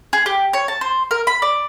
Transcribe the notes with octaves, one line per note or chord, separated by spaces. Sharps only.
G#4
G4
C#5
A5
C5
A#4
B5
D5